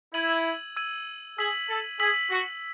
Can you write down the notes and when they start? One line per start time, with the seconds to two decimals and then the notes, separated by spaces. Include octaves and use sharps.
0.14 E4 E6 G#6 D#7 F#7
0.76 E6 G#6 D#7 F#7
1.38 G#4 E6 B6 F#7
1.69 A4
2.00 G#4 E6 B6 F#7
2.31 F#4